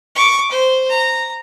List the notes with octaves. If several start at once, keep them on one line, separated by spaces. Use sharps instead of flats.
C#6 D6
C5
A#5